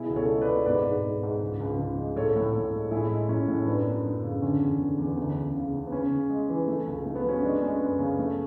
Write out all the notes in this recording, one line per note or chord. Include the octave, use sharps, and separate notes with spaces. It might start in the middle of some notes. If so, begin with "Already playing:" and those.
Already playing: B2 E4 G#4
C#2
A4 C#5
G#3
B4 D5
B2
G#2 B4 D5
G#2
G#2
G#2
C#2
C#2
C#2
G#3
A2 A4 C#5
A2
A2
G#3
A2 E4 G#4
G#3
A2 C#4 E4
A2
F#2 B3 D4
F#2
F#2
C#3
D3 C#4
E2
D3
E2
D2
C#3
C#3
C#3
B3
C#3 C#4
C#3
G#3
E3
A3
C#2
A3
B3
F#3 C#4
G#3 B3 D4
G#3 C#4
F#2 B3
C#3 C#4
A3